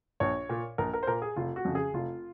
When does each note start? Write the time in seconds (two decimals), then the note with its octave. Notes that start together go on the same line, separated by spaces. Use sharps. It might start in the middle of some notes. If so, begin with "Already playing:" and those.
0.20 A#1 C#5
0.50 A#2
0.78 A#1 A#4
0.93 A#4
1.03 C5
1.07 A#2 A#4
1.22 G#4
1.36 F1 F4
1.56 F#4
1.65 F2 C#3
1.75 G#4
1.94 F1 F4